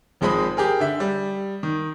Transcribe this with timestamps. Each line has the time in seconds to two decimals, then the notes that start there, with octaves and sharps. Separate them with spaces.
0.21 G#1 F3 G#3 C4 B5 D#6
0.57 G4 G#4 A#4
0.80 D3 E5
1.00 G3
1.63 D#3